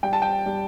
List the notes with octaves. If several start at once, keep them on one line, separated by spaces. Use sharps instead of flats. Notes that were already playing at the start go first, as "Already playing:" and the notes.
G3 G5
A5
G5
G3